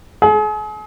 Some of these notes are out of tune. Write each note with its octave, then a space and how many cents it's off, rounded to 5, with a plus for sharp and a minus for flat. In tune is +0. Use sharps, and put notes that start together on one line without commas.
G#4 +40